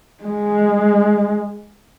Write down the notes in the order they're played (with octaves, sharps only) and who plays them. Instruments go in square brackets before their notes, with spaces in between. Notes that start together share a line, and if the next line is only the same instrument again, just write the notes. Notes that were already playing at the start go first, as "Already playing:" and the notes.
[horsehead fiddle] G#3